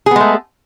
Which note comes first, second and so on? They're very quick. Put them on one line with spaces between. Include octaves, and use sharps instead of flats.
G#4 B3 G#3 A3